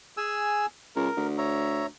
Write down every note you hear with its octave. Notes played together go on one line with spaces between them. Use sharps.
G#4 G#5 E6
C#2 A#4
D2
C#5 E5 A#5